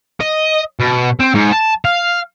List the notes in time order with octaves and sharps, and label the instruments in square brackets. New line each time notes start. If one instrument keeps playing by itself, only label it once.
[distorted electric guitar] D#5
B2
C4
G#2
A5
F5